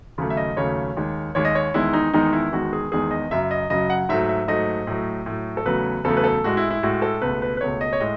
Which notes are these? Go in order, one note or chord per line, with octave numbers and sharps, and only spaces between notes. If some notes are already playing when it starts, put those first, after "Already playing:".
D#2 C#3 F#3 A3
E5
D#5
D#2 C#3 F#3 A3 C#5
D#2 D#3 G#3
D#2 D#3 G#3 C#5
D#5
C#5
E2 D#3 G#3 E4
D#4
E2 D#3 G#3 D#4
E4
E2 D#3 G#3 F#4
G#4
E2 D#3 G#3 G#4
D#5
F#2 C#3 F#3 E5
D#5
F#2 C#3 F#3 D#5
F#5
G#2 F#3 A3 E5
E5
G#2 F#3 A3 D#5
A2 F#3 A3
A2 F#3 A3
A4
E2 C#3 F#3 A3 B4
E2 C#3 F#3 A3 A4
B4
A4
A2 G#3 F#4
E4
E4
A2 G#3 F#4
A4
C#2 B2 A3 B4
B4
B4
C#2 B2 A3 C#5
D#5
C#5
A2 G#3 D#5